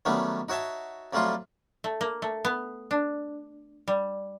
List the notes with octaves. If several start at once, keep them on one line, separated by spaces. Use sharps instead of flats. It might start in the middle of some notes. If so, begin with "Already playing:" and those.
D#3 F#3 G3 A3 B3 C#4
D#4 F#4 C#5 E5 A5
F2 F#3 G3 A3 F4 C6
A3
A#3
A3
B3
D4
G3